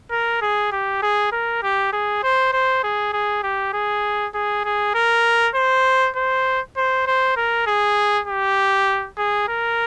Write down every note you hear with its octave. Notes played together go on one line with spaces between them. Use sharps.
A#4
G#4
G4
G#4
A#4
G4
G#4
C5
C5
G#4
G#4
G4
G#4
G#4
G#4
A#4
C5
C5
C5
C5
A#4
G#4
G4
G#4
A#4